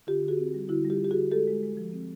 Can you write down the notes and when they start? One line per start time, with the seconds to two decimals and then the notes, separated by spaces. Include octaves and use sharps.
0.07 D3 F4 G4
0.23 D3
0.28 F#4 G#4
0.38 C4
0.54 G3
0.69 D3 E4 F#4
0.85 G3
0.90 F4 G4
1.00 G3 G4
1.11 D3 F#4 G#4
1.31 G#3 G4 A4
1.47 G#3
1.63 G#3
1.77 F3
1.93 C4